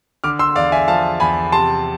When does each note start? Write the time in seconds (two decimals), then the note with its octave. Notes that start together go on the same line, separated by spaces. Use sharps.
0.24 D3 D6 F6
0.39 C6 E6
0.56 E2 D5 F5
0.72 E5 G#5
0.88 F3 F5 A5
1.20 E2 G#5 B5
1.52 C3 A5 C6